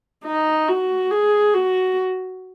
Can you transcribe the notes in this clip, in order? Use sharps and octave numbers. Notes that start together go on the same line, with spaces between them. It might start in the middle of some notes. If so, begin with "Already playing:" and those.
D#4
F#4
G#4
F#4